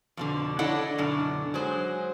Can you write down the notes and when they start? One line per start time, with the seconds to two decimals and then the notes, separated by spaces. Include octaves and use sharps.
0.17 F2 B2 D3
0.59 D4 E4 A4 C#5 D#5 F#5
0.98 F#2 B2 D3 D4
1.54 F#3 G#3 C5